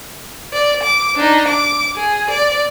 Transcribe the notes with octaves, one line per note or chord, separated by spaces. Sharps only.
D5
D6
D4 D#4
D6
G#4
D5